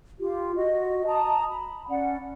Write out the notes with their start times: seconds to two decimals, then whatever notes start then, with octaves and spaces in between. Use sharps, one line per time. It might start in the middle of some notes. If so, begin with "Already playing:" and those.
0.20 F4 G4
0.55 F#4 D#5
1.06 A5 A#5 D#6
1.48 B5
1.89 C#4 D5 F#5